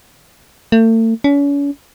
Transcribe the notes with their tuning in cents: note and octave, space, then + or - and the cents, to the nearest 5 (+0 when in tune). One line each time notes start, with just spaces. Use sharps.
A3 +40
C#4 +40